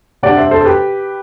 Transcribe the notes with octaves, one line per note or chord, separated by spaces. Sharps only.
C3 G3 D4 D5 F#5
C5 E5
A4 C5
A4
G4 B4